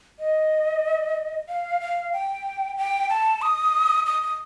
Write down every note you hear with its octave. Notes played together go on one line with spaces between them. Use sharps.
D#5
F5
F5
G5
G5
A5
D#6
D#6
D#6